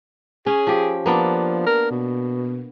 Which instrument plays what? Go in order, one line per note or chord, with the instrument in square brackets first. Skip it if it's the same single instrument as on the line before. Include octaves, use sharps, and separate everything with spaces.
[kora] C#4 [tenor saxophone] G#4
[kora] F3 G4
[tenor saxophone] F3 [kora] A#3 B3 D4
[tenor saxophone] A#4
B2